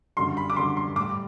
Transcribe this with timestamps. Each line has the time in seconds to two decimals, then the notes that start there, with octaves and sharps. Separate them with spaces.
0.17 F#2 D3 G3 C6
0.37 B5
0.50 D6
0.56 F#2 D3 G3 C6
0.77 C6
0.96 A2 G3 D6